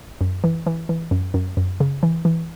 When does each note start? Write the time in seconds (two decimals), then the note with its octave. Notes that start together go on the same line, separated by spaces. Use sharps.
0.21 F#2
0.44 E3
0.66 E3
0.89 E3
1.11 F#2
1.34 F#2
1.57 F#2
1.80 C#3
2.03 E3
2.25 E3